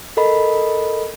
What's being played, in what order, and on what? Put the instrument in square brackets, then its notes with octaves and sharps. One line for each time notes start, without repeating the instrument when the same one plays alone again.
[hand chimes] A4 A#4 D#5 B5